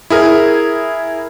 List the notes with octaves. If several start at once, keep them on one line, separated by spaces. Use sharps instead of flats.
E4 G#4 A#4